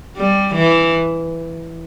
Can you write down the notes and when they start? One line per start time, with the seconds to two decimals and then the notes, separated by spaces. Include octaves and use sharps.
0.17 G3
0.55 E3